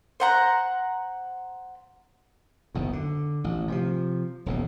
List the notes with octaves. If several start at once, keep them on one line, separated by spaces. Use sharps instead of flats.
C5 F#5 A#5
F#1 B1 E2
D3
A1
C3 E3 F3
D#1 B1 A2